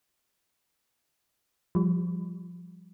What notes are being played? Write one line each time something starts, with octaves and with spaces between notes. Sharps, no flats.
F3 G3